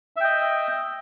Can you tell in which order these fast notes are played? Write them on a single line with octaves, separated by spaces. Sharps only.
E5 G5 D#5